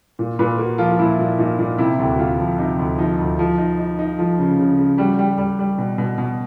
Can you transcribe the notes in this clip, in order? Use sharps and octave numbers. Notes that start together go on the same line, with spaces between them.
A#2
A#2 B4
A#3 F#4
F3 F4
F4
A#2 E4
A#2
A#2 D#4
A#2
C3 E4
D2 G4
F#4
D2 F4
F3
C3 D#4
D2
F3 D#4
D2
F3
D#4
D#4
D#4
F3
C#3
C#3
C#3
G3 F#4
G3
G3
G3
B2
B2
B2